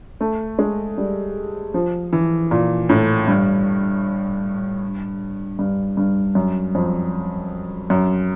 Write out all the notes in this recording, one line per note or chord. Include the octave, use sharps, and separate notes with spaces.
A3
G#3
G3
F3
E3
A#2
A2
G2
G2
G2
F#2
F2
F#2